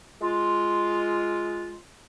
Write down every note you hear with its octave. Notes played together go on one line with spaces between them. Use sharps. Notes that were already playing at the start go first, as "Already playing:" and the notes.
G#3 F4